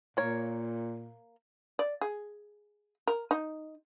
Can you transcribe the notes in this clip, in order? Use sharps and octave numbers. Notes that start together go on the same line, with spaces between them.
A#2 A#3 C#5
D5
G#4
A#4
D#4